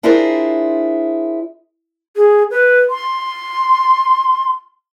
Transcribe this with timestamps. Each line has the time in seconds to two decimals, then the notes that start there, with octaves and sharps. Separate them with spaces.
0.03 D4 E4 F4 G#4 A#4 C5
2.16 G#4
2.51 B4
2.90 C6